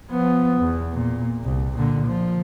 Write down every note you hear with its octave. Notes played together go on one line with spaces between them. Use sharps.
F3 B3
E2
A#2
C2
A#2 D3
F3